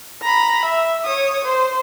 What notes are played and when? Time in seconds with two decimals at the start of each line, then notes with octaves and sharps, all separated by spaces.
0.22 A#5 B5
0.65 E5
1.05 C#5 D#6
1.44 C5